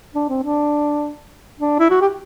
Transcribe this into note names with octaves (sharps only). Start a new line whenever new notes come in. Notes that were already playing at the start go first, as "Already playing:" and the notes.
D4
C4
D4
D4
E4
F#4
G4